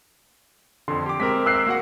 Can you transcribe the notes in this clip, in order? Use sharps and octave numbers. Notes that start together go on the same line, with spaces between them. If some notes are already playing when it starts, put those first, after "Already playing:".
F2 D3 C6
G4 D6
G#3 C4 A#4 B6
E6 F#6 C7
A#3 F#4 F#5